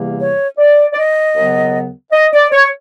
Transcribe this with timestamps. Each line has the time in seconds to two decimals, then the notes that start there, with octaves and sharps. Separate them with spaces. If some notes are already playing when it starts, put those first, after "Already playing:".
Already playing: E2 C3 E3 G3 A#3
0.19 C#5
0.58 D5
0.93 D5
0.96 D#5
1.36 D#2 C#3 F#3 B3
2.12 D#5
2.33 D5
2.52 C#5